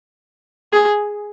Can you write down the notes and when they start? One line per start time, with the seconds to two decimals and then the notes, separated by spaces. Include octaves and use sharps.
0.73 G#4